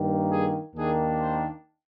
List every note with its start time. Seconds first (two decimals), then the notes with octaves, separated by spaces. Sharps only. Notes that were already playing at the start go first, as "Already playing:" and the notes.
Already playing: G2 D#3 A#3
0.30 G#4
0.75 D#2 D#3 A#3 D4 G#4
1.19 C5